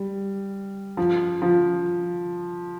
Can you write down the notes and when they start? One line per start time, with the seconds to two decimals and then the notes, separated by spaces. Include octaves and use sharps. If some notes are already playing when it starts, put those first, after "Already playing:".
Already playing: G3
0.97 F3
1.42 F3